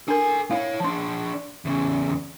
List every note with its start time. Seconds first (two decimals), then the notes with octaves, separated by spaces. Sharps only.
0.08 D4 A4 A#4 G#5
0.51 E4 C#5 F5
0.80 F3 D4 A5 C6
1.65 E2 C#3